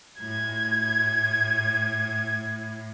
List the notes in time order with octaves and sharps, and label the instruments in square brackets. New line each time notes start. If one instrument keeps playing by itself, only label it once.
[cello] A2 [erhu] G#6